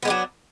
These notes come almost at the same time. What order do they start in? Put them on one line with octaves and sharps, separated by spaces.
B3 G#3 D4 F#3